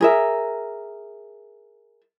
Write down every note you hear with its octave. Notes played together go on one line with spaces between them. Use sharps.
G#4 A#4 E5